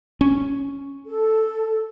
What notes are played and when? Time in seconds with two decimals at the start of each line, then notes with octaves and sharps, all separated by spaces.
0.21 C#4
1.06 A4